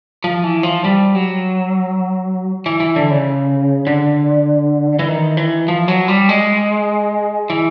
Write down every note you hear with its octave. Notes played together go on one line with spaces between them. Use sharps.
F3
E3
F3
G3
F#3
E3
E3
D3
C#3
D3
E3
D#3
E3
F3
F#3
G3
G#3
E3